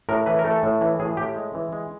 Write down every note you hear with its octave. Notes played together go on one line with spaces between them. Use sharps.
A2 A#4
E3 B4
A#4
A3
A4
A2
E3
A2 G#4
A2 G4
G#3
E3
G#3